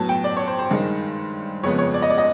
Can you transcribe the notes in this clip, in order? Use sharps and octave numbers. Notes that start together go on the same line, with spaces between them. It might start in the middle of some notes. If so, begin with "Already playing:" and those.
Already playing: A2 F#3 B3 A5
G5
D5
C#5
C5
C5
G2 D#3 G#3
F2 C#3 F3 G#3 B3 C#5
C#5
D5
D#5
D5
D#5